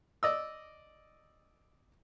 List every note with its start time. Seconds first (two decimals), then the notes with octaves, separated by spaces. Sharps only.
0.23 D5 D#5 E6